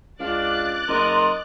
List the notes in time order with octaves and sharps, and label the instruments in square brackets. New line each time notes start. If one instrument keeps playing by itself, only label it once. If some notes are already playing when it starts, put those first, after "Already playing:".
[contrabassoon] C#2 [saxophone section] D4 D5 F5 [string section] D6 F#6 A6
[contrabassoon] F#1 [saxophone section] A#4 D#5 [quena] C6